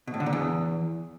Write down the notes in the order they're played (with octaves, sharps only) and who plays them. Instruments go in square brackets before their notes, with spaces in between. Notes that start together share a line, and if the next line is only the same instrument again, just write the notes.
[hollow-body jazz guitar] B2
A2
D3
A#2
E2